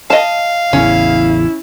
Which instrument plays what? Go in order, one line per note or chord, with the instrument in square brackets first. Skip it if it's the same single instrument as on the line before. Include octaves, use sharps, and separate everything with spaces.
[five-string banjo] D#5 A5 [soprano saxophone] F5
[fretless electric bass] A1 E2 C#3 [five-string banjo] C#4 [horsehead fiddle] E4